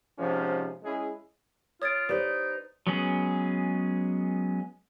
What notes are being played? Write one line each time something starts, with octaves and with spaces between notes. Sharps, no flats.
G#2 C3 F3 C#4
G#3 C#4 E4 G#4
F4 C#5 D#6 G#6 A6 D7
D#4 G4 B4 C5 D5
F#3 G#3 B3 C#4 G#4